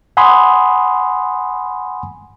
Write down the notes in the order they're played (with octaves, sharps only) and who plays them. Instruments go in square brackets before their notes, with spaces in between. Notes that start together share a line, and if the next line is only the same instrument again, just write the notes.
[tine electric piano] F#5 G#5 B5 C6 D#6